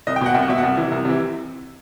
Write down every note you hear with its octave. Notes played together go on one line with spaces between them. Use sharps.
C2 D#5
G5
B2 F#5
C2 G5
F#5
B2 E5
C2 F#5
C3 E3
C2
C3 E3